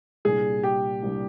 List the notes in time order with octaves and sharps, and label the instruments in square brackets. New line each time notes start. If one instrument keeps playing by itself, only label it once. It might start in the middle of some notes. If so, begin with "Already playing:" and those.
[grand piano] C2 A#2 G3 A#3 D4 [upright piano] G#4
[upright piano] G4
[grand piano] C2 A#2 G3 A#3 D4